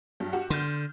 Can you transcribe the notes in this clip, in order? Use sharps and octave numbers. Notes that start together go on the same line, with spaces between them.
G2 F#3
F#4 G4 F#5
D3 C6 F6 G6